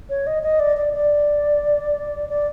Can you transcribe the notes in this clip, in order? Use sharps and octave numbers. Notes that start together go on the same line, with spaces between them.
C#5
D#5
D#5
D5
D5
D5
D5